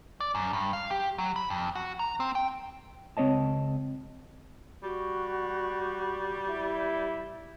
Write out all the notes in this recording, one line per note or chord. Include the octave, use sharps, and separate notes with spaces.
D5
F#2
G2
F5
G4
F#3
B5
F2
F#4
A#5
C4
G5
C#2 C4 C#5 D#5 A5
G3 F#4
E4